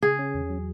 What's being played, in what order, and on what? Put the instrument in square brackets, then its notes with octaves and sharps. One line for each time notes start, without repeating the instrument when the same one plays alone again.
[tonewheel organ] C#3 [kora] G#4
[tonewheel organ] C#4
E2
F#3